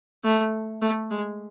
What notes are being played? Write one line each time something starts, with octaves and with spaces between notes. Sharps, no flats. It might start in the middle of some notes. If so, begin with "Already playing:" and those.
A3
A3
G#3